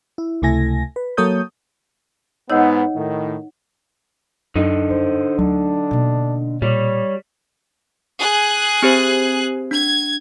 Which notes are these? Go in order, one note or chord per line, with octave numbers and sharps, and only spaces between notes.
E4
C#2 C3 A3 E4 G#5 A#6
B4
F#3 A#3 A4 C#5 D#6 G6
G#2 G#3 B3 D#4 C#5 D#5 F#5 E6
A2 D#3
F#2 D3 D#4
G2 C5
D2 F#3 D4
B2 A#3
A#2 G3 C#5
G#4 F#6
C4 G4 C5
D4 G#6